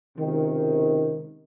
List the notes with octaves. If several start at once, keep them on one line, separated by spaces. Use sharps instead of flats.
C#2 C3 D#3